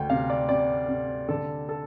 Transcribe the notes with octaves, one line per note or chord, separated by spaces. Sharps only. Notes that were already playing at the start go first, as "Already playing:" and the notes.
Already playing: D2 G5
C3 F5
D5
C3 D5
C3
D3 A4
A4